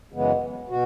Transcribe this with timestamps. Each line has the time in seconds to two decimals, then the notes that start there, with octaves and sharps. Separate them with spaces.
0.12 F#2 C#3 E3 G#3 B3
0.69 B2 F#4